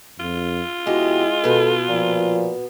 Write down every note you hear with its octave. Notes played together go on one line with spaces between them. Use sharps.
F2 F4
B2 G#3 E4 F#4 G4
B2 B3 A4
A#2 F3